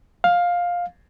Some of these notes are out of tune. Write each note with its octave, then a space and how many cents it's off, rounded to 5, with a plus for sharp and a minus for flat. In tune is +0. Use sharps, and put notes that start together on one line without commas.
F5 +10